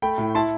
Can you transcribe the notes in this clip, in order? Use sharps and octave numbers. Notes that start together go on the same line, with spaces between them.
A3 G5 B5
A2
E4 A5 C6